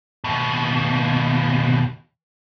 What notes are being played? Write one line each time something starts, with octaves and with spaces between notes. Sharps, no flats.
D#2 B2